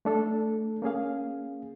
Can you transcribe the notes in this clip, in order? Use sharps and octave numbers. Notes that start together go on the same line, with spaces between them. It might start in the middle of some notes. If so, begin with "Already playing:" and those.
A3 D4 A4
A#3 C#4 G#4 F5